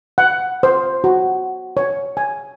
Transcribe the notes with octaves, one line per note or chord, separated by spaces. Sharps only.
F#5
C5
F#4
C#5
G#5